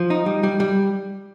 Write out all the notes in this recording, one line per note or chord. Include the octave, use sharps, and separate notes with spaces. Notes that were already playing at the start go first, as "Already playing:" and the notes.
Already playing: F3
D#4
G3
G3
G3